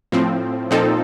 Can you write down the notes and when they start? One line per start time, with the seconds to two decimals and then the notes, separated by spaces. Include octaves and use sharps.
0.12 A2 F3 C4
0.71 A#2 F3 C4 D#4 A4